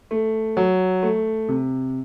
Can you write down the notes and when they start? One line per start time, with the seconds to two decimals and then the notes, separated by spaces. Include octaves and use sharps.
0.11 A3
0.57 F#3
1.03 A3
1.49 C3